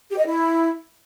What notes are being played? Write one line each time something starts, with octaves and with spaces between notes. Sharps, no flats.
G4
D#5
E4